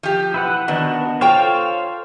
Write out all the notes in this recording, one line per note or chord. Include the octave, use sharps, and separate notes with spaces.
F3 G4
E4 B4 F#5
D#3 B3 D4 F#4
F4 A4 C5 C#5 F5 G5